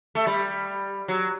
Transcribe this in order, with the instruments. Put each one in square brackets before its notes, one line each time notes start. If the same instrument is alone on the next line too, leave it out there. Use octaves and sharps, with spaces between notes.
[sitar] A3
G3
F#3